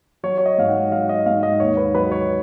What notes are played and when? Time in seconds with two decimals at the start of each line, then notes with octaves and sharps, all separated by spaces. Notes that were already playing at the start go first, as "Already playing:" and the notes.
0.23 F#3 C#5
0.38 C#5
0.46 D#5
0.58 G#2 F5
0.68 F#5
0.92 F#3 F5
1.09 D#5
1.26 G#2 F5
1.43 D#5
1.60 D#2 C#5
1.77 B4
1.95 F#3 B4
2.12 C#5